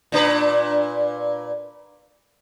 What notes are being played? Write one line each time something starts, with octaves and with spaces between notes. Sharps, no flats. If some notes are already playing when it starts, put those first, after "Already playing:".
A#2 D4 B4